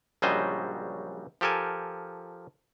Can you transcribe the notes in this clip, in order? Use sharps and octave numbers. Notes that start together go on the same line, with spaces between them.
A#1 C#3 F#3 G3 C5 D#5
F3 G4 A4 A#4 G#5